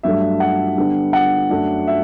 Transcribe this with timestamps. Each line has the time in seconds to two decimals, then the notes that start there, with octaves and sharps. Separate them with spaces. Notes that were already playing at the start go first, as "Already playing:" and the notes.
0.03 G2 F#3 A3 D4 E5
0.40 F#5
0.78 D3 G3 B3 D4
1.13 F#5
1.50 F#2 F#3 A3 D4
1.87 E5